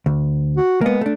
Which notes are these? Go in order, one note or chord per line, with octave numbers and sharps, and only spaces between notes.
D2
F#4
G#3 A#3 B3
A3 D4